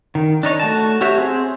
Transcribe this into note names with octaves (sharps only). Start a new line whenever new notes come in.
D#3
D4 D#4 C#5
A3 F#4 A5
F#4 G4 C#5 E5
C4 G#4 C5